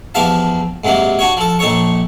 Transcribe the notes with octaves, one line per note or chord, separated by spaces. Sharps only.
E2 F3 G4 E5 F5 A5
G#2 C3 F#3 A#3
D4 F#4 C#5
F3 A4
A#1 D#4 A4 C#5 C#6